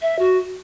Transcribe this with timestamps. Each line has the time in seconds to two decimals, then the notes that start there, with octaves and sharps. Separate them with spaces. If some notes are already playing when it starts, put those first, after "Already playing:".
0.02 E5
0.19 F#4